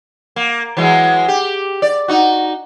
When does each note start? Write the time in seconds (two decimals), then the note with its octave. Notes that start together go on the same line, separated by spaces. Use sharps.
0.36 A#3
0.77 E3 F#3 G#3
1.28 G4
1.82 D5
2.08 D#4 F#4